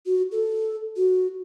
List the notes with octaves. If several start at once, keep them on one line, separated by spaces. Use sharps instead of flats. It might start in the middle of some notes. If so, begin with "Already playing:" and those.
F#4
A4
F#4